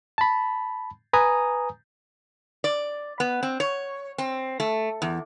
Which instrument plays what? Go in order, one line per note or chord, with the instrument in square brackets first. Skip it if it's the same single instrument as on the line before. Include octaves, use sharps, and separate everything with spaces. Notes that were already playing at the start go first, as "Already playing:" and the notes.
[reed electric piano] A5 B5
B4 G#5 A#5 D#6
[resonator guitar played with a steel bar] D5
B3
C4
C#5
C4
A3
E2